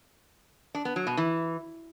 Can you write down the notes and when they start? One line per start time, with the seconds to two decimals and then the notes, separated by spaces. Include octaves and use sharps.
0.75 D4
0.85 B3
0.96 F#3
1.07 B2
1.17 E3